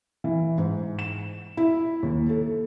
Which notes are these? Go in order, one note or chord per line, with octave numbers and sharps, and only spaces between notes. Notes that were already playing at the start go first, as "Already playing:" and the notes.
E3
G#2
E7
E4
D#2
A4